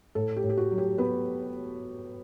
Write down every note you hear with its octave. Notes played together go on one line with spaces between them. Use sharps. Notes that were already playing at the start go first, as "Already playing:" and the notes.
A2 A4
G4
A2
G4
F#4
F#3
G4
B3 B4